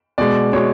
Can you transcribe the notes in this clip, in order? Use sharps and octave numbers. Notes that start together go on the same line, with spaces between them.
B2 G#3 D5
B2 G#3 C#5